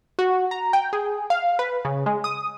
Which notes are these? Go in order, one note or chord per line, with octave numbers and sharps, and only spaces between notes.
F#4
A#5
G5
G#4
F5
B4
C#3
G#3
D#6